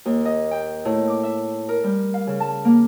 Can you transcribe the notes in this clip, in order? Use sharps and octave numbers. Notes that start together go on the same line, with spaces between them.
D#2
D#5
G5
A2
D6
E5
A#4
G3
F5
C#3
A5
A#3